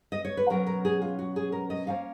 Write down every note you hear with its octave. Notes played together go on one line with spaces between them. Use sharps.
D#5
C#5
B4
B2 F#3 C#4 A#4
A#4
G#4
F4
F#4
G#4
A#4
D#5
F3 A#3 C#4 F5